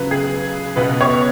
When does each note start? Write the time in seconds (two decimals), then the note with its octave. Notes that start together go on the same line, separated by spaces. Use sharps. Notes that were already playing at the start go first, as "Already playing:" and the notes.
Already playing: C#2 C#3 F#3 B4
0.11 G#4
0.76 C#2 B2 B3 B4
1.01 C#5